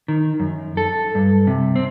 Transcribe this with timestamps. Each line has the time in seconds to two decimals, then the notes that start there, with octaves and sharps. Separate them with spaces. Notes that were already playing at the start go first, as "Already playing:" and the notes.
0.08 D#3
0.40 F#2
0.77 A4
1.15 G2
1.47 C3
1.76 C4